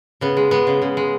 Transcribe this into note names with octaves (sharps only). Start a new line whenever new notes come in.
C#3 B3
G#3
G#3 B3
C#3
C#3
G#3